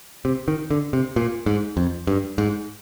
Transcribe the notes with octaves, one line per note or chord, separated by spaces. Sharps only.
C3
D#3
D3
C3
A#2
G#2
F2
G2
G#2